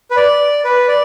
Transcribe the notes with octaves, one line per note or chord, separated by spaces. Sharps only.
B4
D5
B4
D5